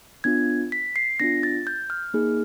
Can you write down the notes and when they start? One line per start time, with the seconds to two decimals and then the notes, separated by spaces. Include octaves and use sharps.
0.24 B3 D4 F4 G#6
0.72 B6
0.96 C7
1.20 B3 D4 F4 A#6
1.43 A6
1.67 G6
1.90 F6
2.14 A#3 D#4 G#4